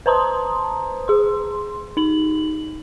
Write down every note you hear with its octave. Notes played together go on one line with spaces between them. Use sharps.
B4 C5 A5 A#5 C6 D#6
G#4 C6
D#4 F#7